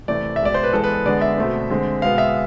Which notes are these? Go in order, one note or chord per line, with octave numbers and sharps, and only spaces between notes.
C3 E3 A3 D5
E5
B2 G#3 B3 D5
C5
B4
E3 G#3 B3 A4
B4
D3 G#3 B3 D5
E5
B2 A3 C4
D3 G#3 C4
B2 G#3 B3 F5
E5